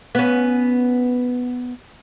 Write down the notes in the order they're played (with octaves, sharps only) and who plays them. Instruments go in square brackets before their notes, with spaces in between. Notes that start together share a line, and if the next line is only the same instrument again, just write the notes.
[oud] B3 C#4